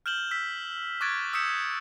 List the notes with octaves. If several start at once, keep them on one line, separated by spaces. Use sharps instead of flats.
F6 G6 E7 F#7 G7
E6 B6
C#6 D6 F#6 G#6 A6 D7
D#6 E6 G6 B6 C#7 E7